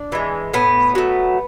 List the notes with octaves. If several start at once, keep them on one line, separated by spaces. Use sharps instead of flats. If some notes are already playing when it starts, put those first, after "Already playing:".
Already playing: D4
E3 G#3
A2 B3
F#3 A3